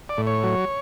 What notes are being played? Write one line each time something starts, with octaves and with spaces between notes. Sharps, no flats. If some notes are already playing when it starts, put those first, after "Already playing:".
D5
A2
C#5
F#3